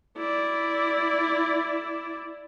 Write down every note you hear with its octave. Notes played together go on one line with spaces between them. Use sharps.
E4 D5